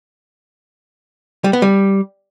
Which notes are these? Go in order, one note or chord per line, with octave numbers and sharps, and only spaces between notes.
G3
B3
G3